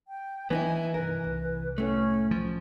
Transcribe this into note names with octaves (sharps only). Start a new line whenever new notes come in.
G5
D#3 E3 B3 D#4 E4 G#5
C2 G2 A#4 B4
C2 C3
A2 A3 C#4
F3